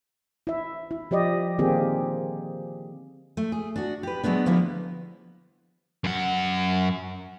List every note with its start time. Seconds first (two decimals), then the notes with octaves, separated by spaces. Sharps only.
0.47 E4 E5
0.91 E4
1.11 F3 G4 D5 D#5
1.58 D3 D#3 A#3 C4 G4 G#4
3.37 A3
3.52 G#4
3.76 D4 F#4
4.03 G4 B4
4.23 F#3 G#3 A3 B3 D4
4.46 D3 F3 G3 A#3 B3 E4
6.04 F#2 F#5